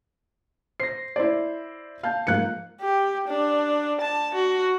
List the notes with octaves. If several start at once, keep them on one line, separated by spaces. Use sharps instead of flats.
C5 A#6 C7
E4 C5 D5
F5 A5 G6
G#2 F3 A#3 F5 F#6 C#7
G4
D4
A5
F#4